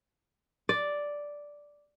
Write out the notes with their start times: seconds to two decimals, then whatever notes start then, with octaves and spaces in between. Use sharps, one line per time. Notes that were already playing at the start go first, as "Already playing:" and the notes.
0.69 D5